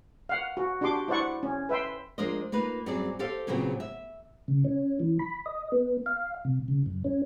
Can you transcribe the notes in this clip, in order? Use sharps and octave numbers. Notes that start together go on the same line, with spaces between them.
F5 F#5
F#4
D4 F#4 G4 C6 D6
E4 C5 D5 F#5 C#6
C#4
B4 E5 G5 C6
F3 G#3 D4 A#4 C5 D#5
A#3 D#4 F4 B4
F#2 F#3 G3 C4 G#4 D5
G4 A4 C5 F5
A#2 C#3 F#3 B3 C4
E5
C#3
C#4
E3
B5
D#5
B3
F5
C3
C#3
F#2
C#4